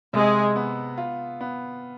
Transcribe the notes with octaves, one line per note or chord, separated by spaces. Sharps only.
C3 G#3
B3
F4
B3